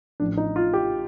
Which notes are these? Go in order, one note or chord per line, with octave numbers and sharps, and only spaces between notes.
A1 A2 F3 D4
D#4
F4
G4